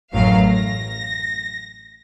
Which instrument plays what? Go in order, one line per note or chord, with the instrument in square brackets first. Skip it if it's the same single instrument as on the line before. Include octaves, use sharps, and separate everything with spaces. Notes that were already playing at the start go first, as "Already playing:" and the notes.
[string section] A1 F#2 A2 F#3 F5
A#6